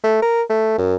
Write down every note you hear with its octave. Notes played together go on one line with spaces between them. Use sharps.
A3
A#4
A3
F#2